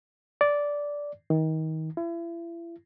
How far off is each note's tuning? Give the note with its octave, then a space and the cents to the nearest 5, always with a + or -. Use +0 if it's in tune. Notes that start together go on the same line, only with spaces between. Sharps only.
D5 -10
D#3 +30
E4 +35